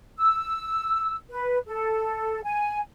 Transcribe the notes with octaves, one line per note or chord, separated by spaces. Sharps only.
E6
B4
A4
G#5